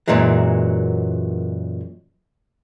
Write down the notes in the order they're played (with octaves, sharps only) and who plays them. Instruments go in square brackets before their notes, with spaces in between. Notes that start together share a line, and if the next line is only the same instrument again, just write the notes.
[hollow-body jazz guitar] F#2 A#2 E3 F#3 G#3